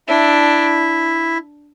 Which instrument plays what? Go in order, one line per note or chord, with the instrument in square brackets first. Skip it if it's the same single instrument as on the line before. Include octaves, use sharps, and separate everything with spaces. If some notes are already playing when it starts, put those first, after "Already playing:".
[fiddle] D4 [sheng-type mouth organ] E4 E5